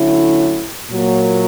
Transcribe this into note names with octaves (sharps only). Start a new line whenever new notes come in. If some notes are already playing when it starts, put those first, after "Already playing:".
Already playing: D3 F#3 A3 C#4 E4
A#2 F#3 A#3